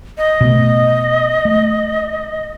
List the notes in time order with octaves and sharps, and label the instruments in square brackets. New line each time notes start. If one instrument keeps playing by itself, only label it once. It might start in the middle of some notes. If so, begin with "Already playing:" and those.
[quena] D#5
[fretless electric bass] B2 A3
A3